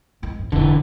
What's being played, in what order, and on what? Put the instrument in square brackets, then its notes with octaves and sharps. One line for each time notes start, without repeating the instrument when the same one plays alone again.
[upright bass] G#3 C4
G#2
[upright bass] F1 B2 [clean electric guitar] D3 E3